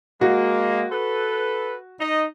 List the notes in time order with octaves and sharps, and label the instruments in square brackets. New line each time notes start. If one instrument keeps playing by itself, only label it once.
[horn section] G#3 A#3 [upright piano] F#4
[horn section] A4 B4
D#4 D#5